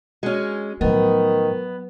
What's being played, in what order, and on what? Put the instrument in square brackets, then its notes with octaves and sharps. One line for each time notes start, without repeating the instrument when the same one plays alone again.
[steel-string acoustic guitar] G#3 C#4 [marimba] F#4
[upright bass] A2 F3 [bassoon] D#3 [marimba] F#3 D#5 [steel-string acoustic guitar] B3